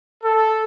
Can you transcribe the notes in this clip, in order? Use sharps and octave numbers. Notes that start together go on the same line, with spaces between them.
A4